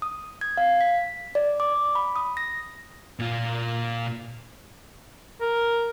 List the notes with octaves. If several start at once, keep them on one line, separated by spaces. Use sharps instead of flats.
D#6
G#6
F5
B6
D5
D6
B5
D#6
A#6
A#2 F4
A#4